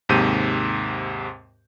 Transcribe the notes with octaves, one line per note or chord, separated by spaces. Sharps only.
D#2 G#2 C3 G6 D#7